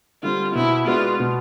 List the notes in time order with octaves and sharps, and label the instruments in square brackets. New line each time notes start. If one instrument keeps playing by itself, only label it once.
[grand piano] D3 G3 C4 [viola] F4
[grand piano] B2 [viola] E4
[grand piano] G#3 B3 D4 F#4 [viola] F4
[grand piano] B2